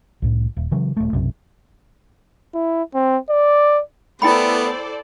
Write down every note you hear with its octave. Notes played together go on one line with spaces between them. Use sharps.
C2 A2
D#1
C#3 E3 F#3
D#1 A3
B1 F#2 C3
E4
C4
D5
A3 B3 E4 A4 C5 D5 G5 B5